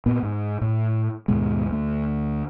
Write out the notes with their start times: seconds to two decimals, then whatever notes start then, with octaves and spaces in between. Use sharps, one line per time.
0.06 A#2 B3
0.23 G#2
0.61 A2
1.28 D#2 G#2 B2 G#3
1.70 D2 A3